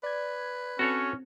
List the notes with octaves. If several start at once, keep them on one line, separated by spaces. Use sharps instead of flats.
B4 D5 G#6
C4 C#4 F#4 A4 C#5